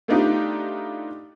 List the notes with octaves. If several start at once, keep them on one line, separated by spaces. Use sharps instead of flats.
A3 B3 D4 D#4 F4 G4